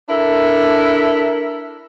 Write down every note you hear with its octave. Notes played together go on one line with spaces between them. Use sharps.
D4 E4 A4 A#4